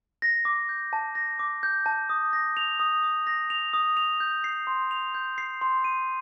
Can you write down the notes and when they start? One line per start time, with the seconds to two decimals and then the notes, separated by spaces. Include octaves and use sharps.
0.22 A#6
0.45 D6
0.69 G6
0.93 A5
1.15 A#6
1.39 D6
1.63 G6
1.86 A5
2.10 D#6
2.33 A#6
2.57 F7
2.80 D#6
3.03 D#6
3.27 A#6
3.50 F7
3.73 D#6
3.97 F7
4.20 G6
4.44 C7
4.67 C6
4.91 F7
5.14 G6
5.38 C7
5.61 C6
5.84 D#7